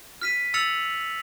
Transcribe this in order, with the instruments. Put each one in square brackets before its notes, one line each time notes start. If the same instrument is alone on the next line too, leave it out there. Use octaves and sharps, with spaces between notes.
[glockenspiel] F6 B6 D#7
E6 F6 A6 C#7 F7 F#7